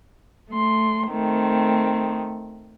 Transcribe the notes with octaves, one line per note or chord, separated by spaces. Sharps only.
A3 C6
D#3 A3 C4